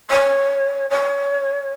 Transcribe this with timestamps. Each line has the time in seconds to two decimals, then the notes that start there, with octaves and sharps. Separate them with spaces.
0.10 C#5
0.90 C#5